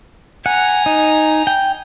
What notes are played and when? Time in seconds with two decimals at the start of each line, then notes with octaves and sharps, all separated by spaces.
0.46 F#5 G#5 A#5
0.86 D#4
1.47 G5